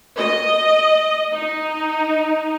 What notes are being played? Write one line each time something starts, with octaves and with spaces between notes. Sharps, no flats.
D#5
D#4